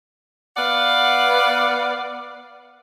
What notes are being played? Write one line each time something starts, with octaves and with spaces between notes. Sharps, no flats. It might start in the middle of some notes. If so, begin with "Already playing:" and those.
B3 B4 D5 F5 F#5